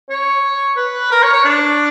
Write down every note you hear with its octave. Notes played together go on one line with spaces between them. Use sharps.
C#5
B4
A#4
C#5
C#5
D4